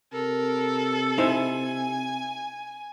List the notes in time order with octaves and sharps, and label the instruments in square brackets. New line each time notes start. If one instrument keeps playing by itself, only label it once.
[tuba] C3 [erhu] A4 [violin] A#4
[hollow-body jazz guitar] D#4 E4 C5 [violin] G#5